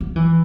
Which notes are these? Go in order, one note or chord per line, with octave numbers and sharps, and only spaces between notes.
F#3
E3